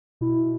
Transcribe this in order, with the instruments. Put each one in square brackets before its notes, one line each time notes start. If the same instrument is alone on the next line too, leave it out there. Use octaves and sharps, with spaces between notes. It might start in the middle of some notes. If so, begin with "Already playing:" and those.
[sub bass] B2 [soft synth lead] E4